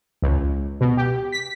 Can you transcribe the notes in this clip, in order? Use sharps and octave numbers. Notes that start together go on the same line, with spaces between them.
C#2
B2
G4
B6